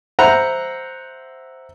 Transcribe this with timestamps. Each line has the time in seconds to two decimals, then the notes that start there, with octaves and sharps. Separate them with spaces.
0.19 C5 E5 F#5 A#5 B5